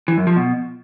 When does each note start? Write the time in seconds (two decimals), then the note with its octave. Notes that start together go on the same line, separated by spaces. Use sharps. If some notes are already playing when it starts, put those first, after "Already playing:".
0.08 E3
0.17 F#2
0.27 F3
0.36 B2